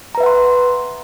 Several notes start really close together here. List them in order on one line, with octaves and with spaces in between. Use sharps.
A#5 B4 E5 F#5 C6